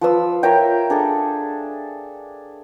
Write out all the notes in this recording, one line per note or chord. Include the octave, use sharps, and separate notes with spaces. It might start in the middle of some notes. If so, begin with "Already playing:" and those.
F3 B4 E6
A#4 C#5 E5 G5
D4 G#4 A4